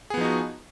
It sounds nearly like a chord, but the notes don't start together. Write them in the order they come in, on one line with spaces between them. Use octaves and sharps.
G#4 B3 F3 D#4 F#4